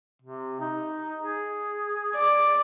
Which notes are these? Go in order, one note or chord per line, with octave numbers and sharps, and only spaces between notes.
C3
D#4
G#4
D5